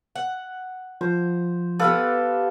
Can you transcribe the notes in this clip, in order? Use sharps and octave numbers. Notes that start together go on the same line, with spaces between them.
F#5
F3 C5
B3 G4 A4 B4 F5